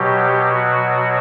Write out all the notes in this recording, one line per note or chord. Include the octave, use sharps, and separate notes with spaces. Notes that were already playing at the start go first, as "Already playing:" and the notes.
Already playing: B2 F#3 G4
F#4